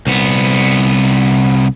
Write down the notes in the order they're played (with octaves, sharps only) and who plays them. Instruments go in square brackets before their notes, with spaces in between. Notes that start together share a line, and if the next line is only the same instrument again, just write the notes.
[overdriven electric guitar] C2 B3